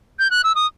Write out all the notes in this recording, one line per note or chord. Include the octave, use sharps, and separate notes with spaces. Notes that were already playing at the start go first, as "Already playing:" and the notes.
G6
F#6
E6
D#6